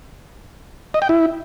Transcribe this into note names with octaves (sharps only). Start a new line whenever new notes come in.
D#5
G5
E4